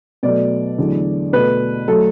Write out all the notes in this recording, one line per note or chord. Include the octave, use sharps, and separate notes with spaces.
B2 F#3 A3 D5
E2 D3 F#3 A3
B2 A3 B4
F#3 A3 A4